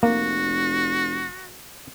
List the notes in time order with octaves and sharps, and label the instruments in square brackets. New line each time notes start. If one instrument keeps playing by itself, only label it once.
[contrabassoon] F1 [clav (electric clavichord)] A#3 [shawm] F#4